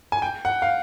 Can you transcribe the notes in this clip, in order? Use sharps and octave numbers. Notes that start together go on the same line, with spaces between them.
G#5
G5
F#5
F5